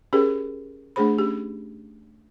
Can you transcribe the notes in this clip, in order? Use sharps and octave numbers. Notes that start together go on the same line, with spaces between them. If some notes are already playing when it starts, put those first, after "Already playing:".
C#4 G4 G#4 A#4 C5
A3 D4 G#4 C5 B5
C#4 G4